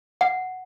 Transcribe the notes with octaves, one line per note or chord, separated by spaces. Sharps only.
F#5